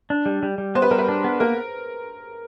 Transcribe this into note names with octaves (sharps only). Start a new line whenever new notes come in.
D4
G3
G3
G3
B3 C5
B4
G3 A#4
B4
D4
B3
A#3 A#4